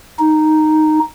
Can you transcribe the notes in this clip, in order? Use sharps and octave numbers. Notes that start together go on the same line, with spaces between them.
D#4